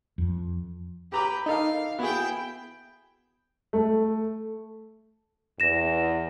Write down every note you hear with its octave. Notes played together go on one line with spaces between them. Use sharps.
F2
G4 B4 G5 A#5 D6
D#4 A4 A#4 D#5 F5
B3 E4 F#4 G#4 G5
A3
E2 A#6 E7